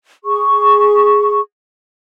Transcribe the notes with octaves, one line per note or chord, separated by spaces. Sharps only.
G#4 C#6